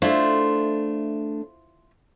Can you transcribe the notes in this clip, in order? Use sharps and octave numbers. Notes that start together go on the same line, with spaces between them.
A3 D4 E4 F4 C5